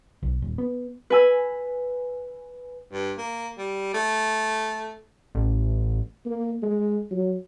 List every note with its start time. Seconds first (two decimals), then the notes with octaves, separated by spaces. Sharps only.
0.23 B1
0.42 D#1
0.58 B3
1.10 B4 G#5 E6
2.92 G2
3.18 A#3
3.58 G3
3.94 A3
5.35 A1
6.26 A#3
6.63 G#3
7.11 F#3